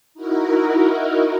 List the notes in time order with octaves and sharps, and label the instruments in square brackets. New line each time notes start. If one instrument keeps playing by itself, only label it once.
[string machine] D#4 E4 F#4 A#4